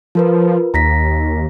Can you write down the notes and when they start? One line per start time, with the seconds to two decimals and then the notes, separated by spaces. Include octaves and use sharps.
0.15 F3 F4 A#4 B4
0.74 D#2 A#5 A#6 B6